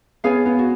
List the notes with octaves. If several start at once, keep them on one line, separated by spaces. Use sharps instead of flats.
B3 G#4 C#5 F5 G#5
B3
F#4